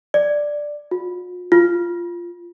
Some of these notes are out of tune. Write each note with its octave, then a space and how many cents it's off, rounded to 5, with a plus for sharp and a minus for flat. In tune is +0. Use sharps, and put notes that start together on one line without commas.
D5 +5
F4 +45
F4 -10